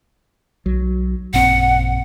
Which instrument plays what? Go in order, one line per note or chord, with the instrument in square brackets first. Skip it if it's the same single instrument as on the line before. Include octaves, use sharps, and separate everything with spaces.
[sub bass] B1 [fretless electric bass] F#3
[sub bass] A1 [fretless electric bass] F#2 A#2 C4 [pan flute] F#5